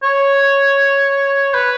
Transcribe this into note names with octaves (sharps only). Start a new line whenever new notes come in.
C#5
B4